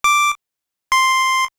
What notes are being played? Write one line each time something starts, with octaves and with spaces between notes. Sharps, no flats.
D6
C6